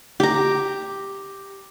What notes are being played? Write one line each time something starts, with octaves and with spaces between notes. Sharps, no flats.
G4 A#5